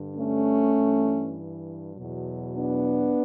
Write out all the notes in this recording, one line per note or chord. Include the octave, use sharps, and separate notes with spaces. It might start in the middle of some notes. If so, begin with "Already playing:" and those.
Already playing: G2 D3
A3 C#4
G2 E3
E2 B2 F#3
B3 D4